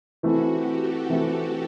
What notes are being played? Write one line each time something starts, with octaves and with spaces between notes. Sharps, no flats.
E3 A3 C4 E4 F#4
G4
A4
E3 A3 C4 E4 A4